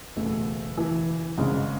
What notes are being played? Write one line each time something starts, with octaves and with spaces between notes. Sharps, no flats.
F#1 E2 B2 A3
E3
G#1 G#2 C#3 G#3 D4